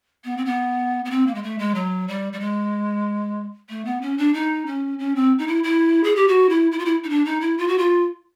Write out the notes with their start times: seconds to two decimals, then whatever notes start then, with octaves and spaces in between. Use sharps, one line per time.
0.24 B3
0.37 C4
0.45 B3
1.05 B3
1.10 C4
1.26 A#3
1.35 G#3
1.43 A3
1.58 G#3
1.74 F#3
2.08 G3
2.33 G3
2.40 G#3
3.69 A3
3.85 B3
4.01 C#4
4.18 D4
4.34 D#4
4.66 C#4
4.98 C#4
5.15 C4
5.38 D#4
5.47 E4
5.63 E4
6.03 G#4
6.15 G4
6.28 F#4
6.49 E4
6.71 E4
6.79 F4
6.85 E4
7.04 D#4
7.09 D4
7.25 D#4
7.41 E4
7.58 F4
7.68 F#4
7.78 F4